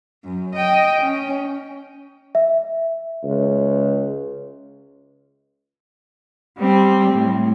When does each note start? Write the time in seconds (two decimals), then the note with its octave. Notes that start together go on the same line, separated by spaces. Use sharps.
0.24 F#2
0.55 D#5 G5
1.02 C#4
2.35 E5
3.24 C#2
6.58 G3 C4
7.11 A2